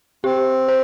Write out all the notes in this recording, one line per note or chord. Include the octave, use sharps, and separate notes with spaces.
C4 G4
C5